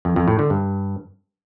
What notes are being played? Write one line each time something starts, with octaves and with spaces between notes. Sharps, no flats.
F2
F2
A2
D3
G2